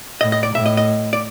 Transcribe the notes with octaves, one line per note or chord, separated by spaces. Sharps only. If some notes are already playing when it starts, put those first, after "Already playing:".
A2 D#5
D#5
D5
A2 E5
D#5
D#5
D5